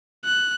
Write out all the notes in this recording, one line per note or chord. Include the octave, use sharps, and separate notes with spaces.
F#6